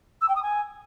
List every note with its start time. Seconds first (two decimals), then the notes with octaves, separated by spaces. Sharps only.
0.21 E6
0.28 G5
0.36 D#6
0.43 G#5